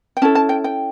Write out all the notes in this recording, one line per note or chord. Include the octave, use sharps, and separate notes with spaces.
G5
C#4 E4 A4 A5
A5
G5
G5